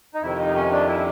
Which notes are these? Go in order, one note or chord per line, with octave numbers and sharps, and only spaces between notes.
D#4
F2 C3 D#3 E4
D#4
C#4
D4
E4